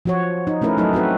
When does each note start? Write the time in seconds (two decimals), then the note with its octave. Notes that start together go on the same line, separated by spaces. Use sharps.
0.05 F3 F#4 C#5
0.47 D#4
0.62 A3 C#4 E4 A#4 B4
0.77 F#3 A3 D#4 A4
0.93 C4 F#4 B4